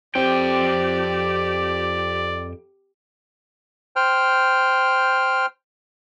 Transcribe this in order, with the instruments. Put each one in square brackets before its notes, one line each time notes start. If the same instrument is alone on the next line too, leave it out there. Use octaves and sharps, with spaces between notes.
[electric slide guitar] F2 G5 [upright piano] C4 [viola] G4 [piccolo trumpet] D5
[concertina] C5 G5 F6